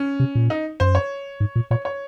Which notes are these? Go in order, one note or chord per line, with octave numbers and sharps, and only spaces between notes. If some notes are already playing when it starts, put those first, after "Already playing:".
Already playing: C#4
C3
A#2
D#4
F#2 C5
C#5
G#2
A#2
A#2 C#5
C#5